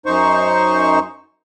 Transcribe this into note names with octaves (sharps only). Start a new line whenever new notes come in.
F#2 D#4 C5 C#6